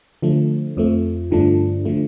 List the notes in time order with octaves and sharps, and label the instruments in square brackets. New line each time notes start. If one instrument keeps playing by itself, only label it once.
[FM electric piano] D3 F3 A3
F2 F3 A3
G2 D3 F3 A3 D4
D3 F3 A3